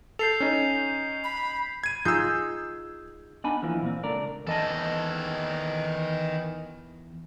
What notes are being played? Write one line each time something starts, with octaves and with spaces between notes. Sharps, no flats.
A4 G6 C7 F7
C#4 D#4
B5
G#6 D#7
D#4 F4 G#4 E6 G6
B3 D4 D#4 G#5 B5
E2 E3 F3 A#3
A#2 C4
C#2 A3 D4 A#4 D5
E2 D#3 E3 A4 D#5 A5